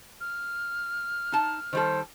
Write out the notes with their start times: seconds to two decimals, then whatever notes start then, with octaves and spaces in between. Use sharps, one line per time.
0.21 F6
1.32 D#4 A5
1.73 D#3 G3 A4 C5